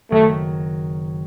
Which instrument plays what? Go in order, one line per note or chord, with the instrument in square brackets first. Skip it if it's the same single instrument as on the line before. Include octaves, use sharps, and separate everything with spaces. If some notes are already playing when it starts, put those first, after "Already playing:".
[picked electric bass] F#1 E2 D#3 F#3 [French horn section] A3